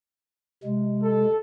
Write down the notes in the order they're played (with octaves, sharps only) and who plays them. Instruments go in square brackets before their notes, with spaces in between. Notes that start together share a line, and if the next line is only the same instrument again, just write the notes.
[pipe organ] C3 G#3
[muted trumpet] A4